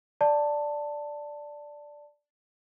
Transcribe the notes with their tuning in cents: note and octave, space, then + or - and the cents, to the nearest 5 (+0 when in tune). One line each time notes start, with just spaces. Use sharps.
D5 +0 A5 +10